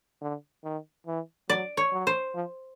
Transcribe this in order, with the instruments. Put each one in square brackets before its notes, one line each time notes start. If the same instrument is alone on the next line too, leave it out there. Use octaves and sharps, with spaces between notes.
[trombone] D3
D#3
E3
[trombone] F#3 [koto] D5
[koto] C#5
[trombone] F#3
[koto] C5
[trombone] F3